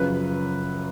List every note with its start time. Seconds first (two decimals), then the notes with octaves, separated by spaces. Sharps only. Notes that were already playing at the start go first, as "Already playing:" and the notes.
Already playing: F#2 C#3 F3 B4